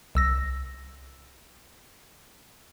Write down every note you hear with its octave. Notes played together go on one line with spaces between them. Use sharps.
C2 E6 A#6